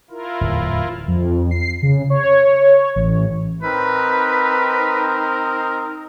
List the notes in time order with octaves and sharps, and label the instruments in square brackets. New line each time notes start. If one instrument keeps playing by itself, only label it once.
[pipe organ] E4 F4 A#4
[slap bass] D1 E2
[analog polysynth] F2
C7
C#3
C#5
A1
[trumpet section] C4 D#4 A#4 [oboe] B4